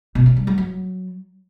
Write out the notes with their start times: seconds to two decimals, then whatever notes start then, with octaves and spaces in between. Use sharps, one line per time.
0.15 B2
0.26 C#4
0.36 G3
0.47 F#3
0.58 F#3